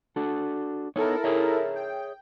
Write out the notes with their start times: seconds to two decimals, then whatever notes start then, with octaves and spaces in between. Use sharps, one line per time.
0.16 D4 F#4 A4
0.96 B3 D#4 E4 A4 A#4 C#5
1.24 G#4 C#5 E5
1.75 G5